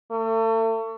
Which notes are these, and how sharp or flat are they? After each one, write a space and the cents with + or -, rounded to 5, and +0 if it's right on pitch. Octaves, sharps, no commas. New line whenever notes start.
A3 +35